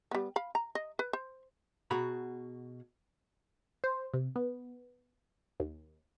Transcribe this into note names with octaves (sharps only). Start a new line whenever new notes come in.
G3 B3
F5 B5
A#5
D#5
B4
C5
B2 F#4 G#4 A#5 B5
C5
C3
B3
D#2